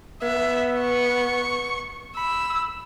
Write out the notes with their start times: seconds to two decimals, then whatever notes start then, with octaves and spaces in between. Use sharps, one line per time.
0.22 B3 E5
0.81 C#6
2.17 B5 E6